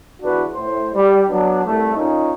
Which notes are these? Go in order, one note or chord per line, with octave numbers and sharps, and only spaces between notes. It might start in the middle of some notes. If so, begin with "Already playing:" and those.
E2 D4 F#4 B4
A2 C5
G3
F#3 B3 D4
C2 A3
A#2 C#4 D#4